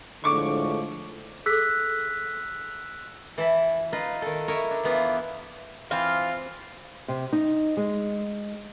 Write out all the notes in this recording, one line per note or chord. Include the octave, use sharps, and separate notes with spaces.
A2 D3 F3 G#3 C#6 D6
G#4 A4 E6 F#6 B6
E3 E5 A5 B5
D#4 F4 B4 D#5
D#3 A4
E4 A#4 C#5 D#5 E5
D4
E2 E3 B3 E4 F4
E3 C4 F4 F5
C3
D#4
G#3